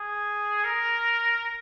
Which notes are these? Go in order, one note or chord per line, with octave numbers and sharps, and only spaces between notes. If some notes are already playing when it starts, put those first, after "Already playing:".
Already playing: G#4
A#4